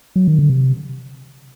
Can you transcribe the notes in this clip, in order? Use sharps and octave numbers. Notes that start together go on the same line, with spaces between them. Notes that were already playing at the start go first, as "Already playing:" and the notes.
F#3
D#3
D3
C3